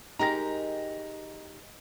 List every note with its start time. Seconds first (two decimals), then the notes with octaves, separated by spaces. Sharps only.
0.19 G#3 D#4 G4 A#4 A#5 A#6